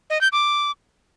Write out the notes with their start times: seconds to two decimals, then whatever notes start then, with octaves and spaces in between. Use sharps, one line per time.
0.10 D#5
0.21 G6
0.32 D6